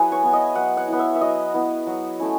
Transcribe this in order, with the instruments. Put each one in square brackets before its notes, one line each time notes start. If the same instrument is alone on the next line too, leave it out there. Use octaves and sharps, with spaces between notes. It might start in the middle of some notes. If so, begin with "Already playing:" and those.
Already playing: [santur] F#3 E4 F#4 G#4 B4
C#5
B3 E4
D#5
F#3 F#5
F#5
B3 E4
E5
E5
F#3 D#5
B3 E4
F#3
A3 C#4 E4